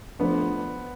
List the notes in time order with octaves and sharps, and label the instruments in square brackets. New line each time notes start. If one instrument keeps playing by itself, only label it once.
[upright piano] F3 A3 D4 [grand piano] B3